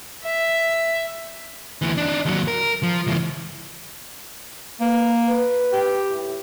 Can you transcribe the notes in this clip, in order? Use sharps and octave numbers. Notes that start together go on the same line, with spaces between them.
E5
D2 E3
D4 D#4
D#2 F#3
A#4
F3
C#2 E3
A#3 B4
B4
G4
A2 E4